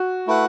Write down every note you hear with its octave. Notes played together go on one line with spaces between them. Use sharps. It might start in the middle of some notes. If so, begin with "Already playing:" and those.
Already playing: F#4
A3 E4 B4 F#5